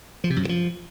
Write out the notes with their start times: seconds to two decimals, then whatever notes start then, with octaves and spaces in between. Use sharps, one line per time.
0.24 F3
0.30 C3
0.36 F#2
0.43 G2
0.49 F3